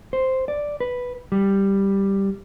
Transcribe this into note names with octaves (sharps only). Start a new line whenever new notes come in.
C5
D5
B4
G3